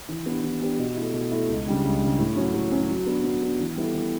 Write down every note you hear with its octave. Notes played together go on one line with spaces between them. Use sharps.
E3
B3 D4 G4
E3
B3 D4 G4
B2
A3 E4
B2
A3 E4
C#2
C#3 G3 D4
C#2
C#3 G3 D4
A2
F#3 C#4 F#4
A2
F#3 C#4 F#4
F#3
B3 D4
F#3
B3 D4
E3
G3 B3 E4 A4
E3